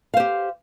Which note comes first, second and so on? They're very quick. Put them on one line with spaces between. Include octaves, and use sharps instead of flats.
F5 C5 G4